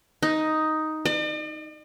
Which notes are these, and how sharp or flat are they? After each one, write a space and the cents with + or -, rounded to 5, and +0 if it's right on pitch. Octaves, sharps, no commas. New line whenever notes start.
D#4 +5
D5 +45